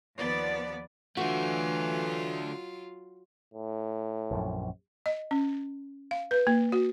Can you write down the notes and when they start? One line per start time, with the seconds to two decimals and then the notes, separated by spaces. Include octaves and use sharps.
0.18 D#2 F3 B3 D5
1.17 D3 E3 F#3 A3 F4 F#4
3.54 A2
4.31 A#1 F#2
5.06 D#5
5.31 C#4
6.11 F5
6.31 B4
6.47 A#3
6.72 F#4